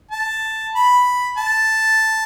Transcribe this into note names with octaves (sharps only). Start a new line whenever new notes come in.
A5
B5
A5